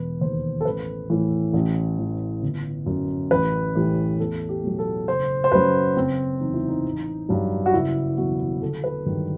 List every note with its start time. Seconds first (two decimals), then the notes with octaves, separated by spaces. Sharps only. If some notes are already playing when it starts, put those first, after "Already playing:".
Already playing: E1 B4
0.21 D#2 D#3 C5
0.61 A4
0.65 A1 B4
1.10 A2 E3
1.54 A1
1.99 A2 E3
2.43 G1
2.86 F#2 F#3
3.31 A1 B4
3.75 A2 E3 G4
4.19 E2 A4
4.49 G4
4.64 B2 F#3
4.79 A4
5.08 F#1 C5
5.44 C5
5.52 F#2 F#3 B4
5.96 F#1 C4
6.41 E2 C3 D#4
6.54 E4
6.68 D#4
6.85 A1
7.29 G2 F#3
7.66 F#4
7.73 F#1 E4
8.17 E2 B2 F#3 F#4
8.62 G1 A4
8.84 B4
9.06 G2 D#3 F#3